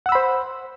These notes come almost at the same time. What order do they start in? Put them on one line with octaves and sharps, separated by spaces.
F#5 E6 B5 C5